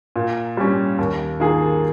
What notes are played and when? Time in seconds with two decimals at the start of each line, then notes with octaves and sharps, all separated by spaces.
0.16 A#2
0.57 G3 C#4
0.98 D#2
1.40 D#3 A#3 F4 G#4